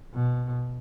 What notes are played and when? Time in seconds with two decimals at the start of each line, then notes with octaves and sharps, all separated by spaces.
0.14 B2